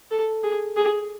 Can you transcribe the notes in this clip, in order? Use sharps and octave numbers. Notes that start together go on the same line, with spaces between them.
A4
G#4
G#4